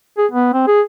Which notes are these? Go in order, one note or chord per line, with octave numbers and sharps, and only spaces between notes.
G#4
B3
C4
G#4